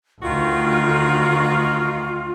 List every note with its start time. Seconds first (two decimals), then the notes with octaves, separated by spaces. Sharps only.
0.22 D2 D#3 D#4 F4 F#4